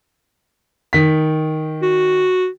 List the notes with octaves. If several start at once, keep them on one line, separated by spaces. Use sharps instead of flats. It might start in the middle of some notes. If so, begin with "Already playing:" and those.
D#3 B6
F#4